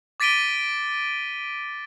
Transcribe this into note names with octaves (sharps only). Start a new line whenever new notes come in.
D6 A6 B6 D7 D#7 G7